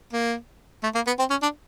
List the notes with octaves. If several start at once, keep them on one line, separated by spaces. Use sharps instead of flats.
A#3
A3
A#3
B3
C4
C#4
D4